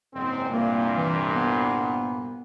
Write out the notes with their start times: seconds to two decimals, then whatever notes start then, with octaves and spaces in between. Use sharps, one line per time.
0.15 F#1 G#2 C4
0.51 C2 G2 A#2 A#3
0.97 E3
1.33 B3